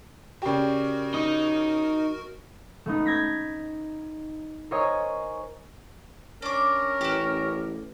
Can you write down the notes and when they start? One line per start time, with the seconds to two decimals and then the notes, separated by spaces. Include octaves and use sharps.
0.42 C#3 F#4 G4 A#4 D5 G5
1.14 D#4 D#6
2.86 A3 B3 D#4
3.05 G6 G#6 A#6 B6
4.71 A#4 C5 C#5 D#5 G#5 D#6
6.42 C#4 D4 A#4 D6
7.01 A1 F#4 G4